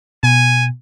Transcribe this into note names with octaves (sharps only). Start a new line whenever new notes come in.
B2 G#5